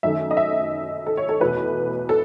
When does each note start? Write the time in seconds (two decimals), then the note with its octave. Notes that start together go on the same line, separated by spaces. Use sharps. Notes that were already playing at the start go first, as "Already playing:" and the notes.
0.03 F#2 D#3 A3 E5
0.31 D#5
0.37 E5
1.07 A4
1.17 C#5
1.29 A4
1.40 E2 B2 A3 B4
2.09 A4